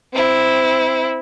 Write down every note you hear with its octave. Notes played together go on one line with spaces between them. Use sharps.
C4 E4